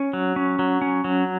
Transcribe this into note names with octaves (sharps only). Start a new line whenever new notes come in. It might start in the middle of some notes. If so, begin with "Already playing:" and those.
Already playing: C#4
F#3
C#4
F#3
C#4
F#3